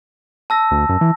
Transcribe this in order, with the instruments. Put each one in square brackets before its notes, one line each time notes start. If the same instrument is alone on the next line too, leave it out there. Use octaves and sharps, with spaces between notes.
[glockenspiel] A5 E6 A#6
[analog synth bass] D2
F#2
E3